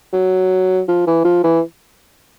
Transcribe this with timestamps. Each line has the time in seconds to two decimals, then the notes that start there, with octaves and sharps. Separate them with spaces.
0.13 F#3
0.88 F3
1.07 E3
1.25 F3
1.43 E3